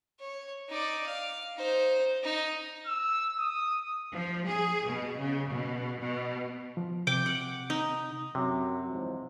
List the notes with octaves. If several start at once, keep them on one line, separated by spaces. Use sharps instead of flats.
C#5
D#4 D5
F5
D#4 C5
D#4
E6
D#6
F3
G#4
B2
C#3
B2
B2
F3
C3 G5 D6
F#5
D#4
F#2 C3 F#3
E2 G#2 F3